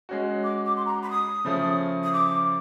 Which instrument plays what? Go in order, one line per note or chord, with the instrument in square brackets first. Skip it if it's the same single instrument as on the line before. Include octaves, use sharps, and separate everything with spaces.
[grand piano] G#3 C#4 F#4
[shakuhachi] D6
D6
C6
A#5
B5
D#6
[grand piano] C#3 F3 A3 C#4
[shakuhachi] D#6
D6